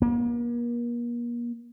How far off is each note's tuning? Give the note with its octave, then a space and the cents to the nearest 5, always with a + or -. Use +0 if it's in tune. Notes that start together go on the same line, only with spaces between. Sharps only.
A#3 +40